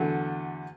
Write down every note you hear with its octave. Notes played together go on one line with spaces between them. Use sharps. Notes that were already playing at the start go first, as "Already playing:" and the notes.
Already playing: E2 D3 F#3 A3